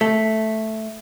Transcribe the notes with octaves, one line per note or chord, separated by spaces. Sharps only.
A3